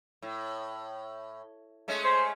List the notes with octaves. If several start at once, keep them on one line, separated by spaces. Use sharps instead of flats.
A2
G#3 A3 C#4
C5